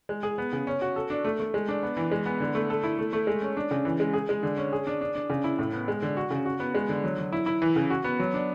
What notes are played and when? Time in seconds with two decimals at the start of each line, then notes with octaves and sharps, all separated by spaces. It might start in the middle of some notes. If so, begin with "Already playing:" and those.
0.09 G#3
0.23 G#4
0.38 B3
0.53 C#3
0.67 C#4
0.82 F#4
0.96 A4
1.10 D4
1.24 A3
1.40 A3
1.54 G#3
1.69 D4
1.83 B3
1.97 E3
2.11 G#3
2.26 B3
2.40 D3
2.55 A3
2.70 A4
2.84 E4
2.99 A3
3.13 A3
3.27 G#3
3.42 C#4
3.57 D4
3.71 C#3
3.85 E3
4.00 G#3
4.13 G#4
4.29 G#3
4.43 D3
4.57 C#4
4.73 G#4
4.87 D4
5.01 D4
5.15 D4
5.30 C#3
5.44 E4
5.59 A2
5.73 B3
5.88 G#3
6.02 D3
6.17 F#4
6.31 C#3
6.46 F#4
6.60 B3
6.74 G#3
6.89 D3
7.04 F#3
7.18 F#3
7.33 E4
7.46 E4
7.62 E3
7.76 C#3
7.90 F#4
8.04 B3
8.19 F#3
8.34 D4